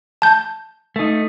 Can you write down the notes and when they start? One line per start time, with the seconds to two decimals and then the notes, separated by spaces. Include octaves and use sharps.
0.22 A5 G6
0.96 A3 D#4